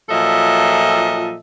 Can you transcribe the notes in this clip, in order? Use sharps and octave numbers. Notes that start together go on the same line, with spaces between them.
A#2 F3 F#3 A4 D#5 E5